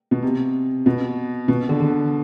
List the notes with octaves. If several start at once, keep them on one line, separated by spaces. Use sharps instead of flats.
B2
C3
B2
B2
D3
D3